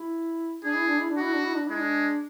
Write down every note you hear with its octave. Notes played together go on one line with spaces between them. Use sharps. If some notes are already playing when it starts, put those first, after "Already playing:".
Already playing: E4
D4 G#4
E4
D4
E4
D4
F#4
E4
D4
E4
D4
G#3 E4
D4